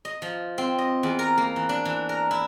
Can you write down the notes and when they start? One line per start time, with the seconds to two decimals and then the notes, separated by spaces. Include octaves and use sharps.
0.05 D#5
0.22 F3
0.58 C4
0.78 D#5
1.03 E2
1.19 A#4
1.38 A#3
1.56 E3
1.69 D4
1.85 E3
2.09 A#4
2.31 E4